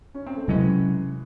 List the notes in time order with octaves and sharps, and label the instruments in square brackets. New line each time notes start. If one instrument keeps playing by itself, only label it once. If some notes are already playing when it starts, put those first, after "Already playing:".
[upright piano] C#4
C4
A3
[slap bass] C3 F#3 C#4 [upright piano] E3 G#3